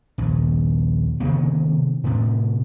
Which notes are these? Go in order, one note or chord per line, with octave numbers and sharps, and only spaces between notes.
A#1 D#2
C3 D#3 A#3 B3
A2 C3